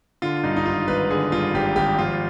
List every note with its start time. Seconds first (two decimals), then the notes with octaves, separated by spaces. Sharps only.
0.22 D3 F4
0.43 G2 D#4
0.57 D#4
0.66 G#1 F4
0.88 G#1 B4
1.10 D3 G#4
1.32 G2 F4
1.54 G#1 G4
1.76 G#1 G4
1.99 F3 F4